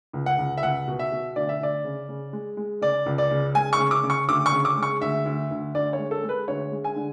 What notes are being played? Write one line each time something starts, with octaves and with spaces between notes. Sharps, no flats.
C#2
F#5
C#2
E5
C#2 F#5
B2
E5
B2
D2 D5
E5
D2 D5
C#3
C#3
G#3
G#3
C#3 D5
C#2
D5
C#3
G#3 G#5
C#6
C#3
D6
C#3
C#6
D2 D6
C#6
C#3
D6
G#3
C#6
D2 E5
D2
D2
D2 D5
C#5
G#3
A4
G#3
B4
D2 C#5
G#3
G#5
D3